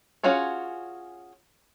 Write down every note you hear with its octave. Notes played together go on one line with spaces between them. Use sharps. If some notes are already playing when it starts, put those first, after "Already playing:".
C#4 F4 F#4 G#4 C#5